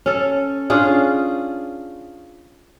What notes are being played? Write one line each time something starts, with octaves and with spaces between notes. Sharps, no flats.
C#4 A4
C#4 D4 F4 G#4